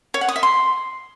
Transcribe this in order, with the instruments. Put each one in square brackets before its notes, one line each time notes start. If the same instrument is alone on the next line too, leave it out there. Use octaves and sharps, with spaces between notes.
[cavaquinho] C#5
F#5
D#6
E5
C6